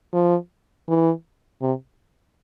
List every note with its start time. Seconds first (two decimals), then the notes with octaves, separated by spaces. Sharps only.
0.13 F3
0.88 E3
1.61 C3